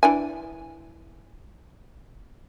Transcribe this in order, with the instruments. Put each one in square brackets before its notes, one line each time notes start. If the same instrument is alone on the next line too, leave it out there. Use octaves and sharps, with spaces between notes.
[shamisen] E3 D4 G#5